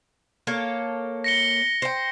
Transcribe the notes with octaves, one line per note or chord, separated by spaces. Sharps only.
A#3 A4 C#5
A#6 C#7 G7
C5 G5